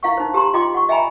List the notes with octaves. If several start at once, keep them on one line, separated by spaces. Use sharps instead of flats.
E4 F5 F#5 C#6
D#4 C5
G4 A#5 C6
F4 D#5 G5 C6 D6
F#5 C#6
D#5 E5 G5 G#5 A#5 B5